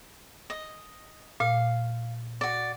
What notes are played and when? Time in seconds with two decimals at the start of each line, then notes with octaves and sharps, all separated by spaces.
0.50 D#5
1.40 A#2 F5
2.41 F#4 D5